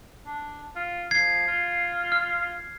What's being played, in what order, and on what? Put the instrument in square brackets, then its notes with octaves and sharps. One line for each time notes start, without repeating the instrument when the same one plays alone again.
[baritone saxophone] D4
F4
[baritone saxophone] F3 [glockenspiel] G#6 C7
[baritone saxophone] F4
[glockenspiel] F6